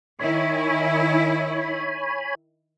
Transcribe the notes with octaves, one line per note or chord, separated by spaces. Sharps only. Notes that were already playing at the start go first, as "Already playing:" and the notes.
D#3 E4 C#5 G#5 B5